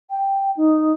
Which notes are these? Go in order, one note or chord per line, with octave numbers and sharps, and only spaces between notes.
G5
D#4